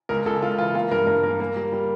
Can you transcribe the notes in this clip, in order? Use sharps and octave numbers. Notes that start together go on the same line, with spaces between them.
C#2 A#4
C#2 A4
C#2 F4
E3 F4
A#3 F4
G2 A#4
G2 A#4
A#3 A#4
A#3
G3
G3